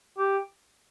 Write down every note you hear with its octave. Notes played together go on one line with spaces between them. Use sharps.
G4